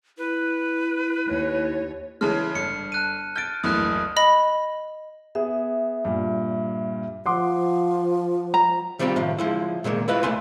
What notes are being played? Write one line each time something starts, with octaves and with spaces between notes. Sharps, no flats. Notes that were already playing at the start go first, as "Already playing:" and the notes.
E4 B4
D#2 C#5
C#3 E3 G#3 A5 F6
G1 C#7
A5 F#6 D#7
F6 G6 A6 D7
F#1 D2 E3 D#6 F#6
D#5 B5
B3 G#4 E5
G2 A#2
F3 F#5 C6 D6
A#5
D#3 G3 C4 F4 G4
A2 D#3 F3
F3 G#3 E4
A#2 D#3 G#3 A#3
E4 F4 B4 D#5
C#2 A#2 A3 E5 G#5 C6